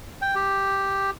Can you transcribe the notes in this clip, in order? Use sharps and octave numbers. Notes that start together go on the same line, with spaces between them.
G5
G4